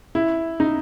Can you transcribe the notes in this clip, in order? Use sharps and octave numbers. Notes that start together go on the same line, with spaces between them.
E4
D#4